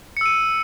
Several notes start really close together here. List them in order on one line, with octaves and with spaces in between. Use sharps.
C#7 E6 D#7